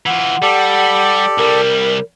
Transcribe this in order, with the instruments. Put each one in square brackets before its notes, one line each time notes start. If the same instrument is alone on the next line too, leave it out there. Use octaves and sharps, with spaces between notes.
[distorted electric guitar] E3 F4 [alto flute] F#5
[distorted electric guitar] G3 [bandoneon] G4 A4 D5
[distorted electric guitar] C2 G3 [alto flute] A#4